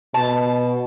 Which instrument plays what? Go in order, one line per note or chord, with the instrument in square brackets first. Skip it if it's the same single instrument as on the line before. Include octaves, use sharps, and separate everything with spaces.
[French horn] B2 [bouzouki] A5